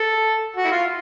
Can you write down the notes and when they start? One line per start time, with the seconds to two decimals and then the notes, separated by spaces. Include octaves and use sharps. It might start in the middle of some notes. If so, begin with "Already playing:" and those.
Already playing: A4
0.56 F#4
0.65 E4
0.72 F4